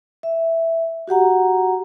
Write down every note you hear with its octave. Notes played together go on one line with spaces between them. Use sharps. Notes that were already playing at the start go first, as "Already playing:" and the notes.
E5
F#4 G4 F#5 A#5